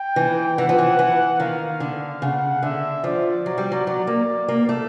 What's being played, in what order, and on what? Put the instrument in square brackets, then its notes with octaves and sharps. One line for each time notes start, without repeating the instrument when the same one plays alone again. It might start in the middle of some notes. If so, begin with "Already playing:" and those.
Already playing: [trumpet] G5
[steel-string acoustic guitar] E3
[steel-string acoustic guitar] E3 [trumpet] F#5
[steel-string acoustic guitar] F3
E3
E3
[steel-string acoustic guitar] D#3 [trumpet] F5
[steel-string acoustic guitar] D3
[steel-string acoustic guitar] C#3 [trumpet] F#5
[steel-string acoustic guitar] D3 [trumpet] E5
[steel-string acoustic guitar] F3 [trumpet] D5
[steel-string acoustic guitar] F#3
G3
F#3
[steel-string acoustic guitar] F#3 [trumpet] D5
[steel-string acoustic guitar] A#3
A#3
A3